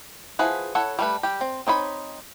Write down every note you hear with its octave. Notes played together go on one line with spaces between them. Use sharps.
F3 E4 G#4 B4 F#5
E4 A4 C#5 F#5
G3 A3 B4
G3 G4
C4
C4 D#4 C#5 B5